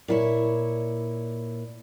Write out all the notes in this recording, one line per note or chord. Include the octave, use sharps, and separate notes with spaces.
A#2 E4 C#5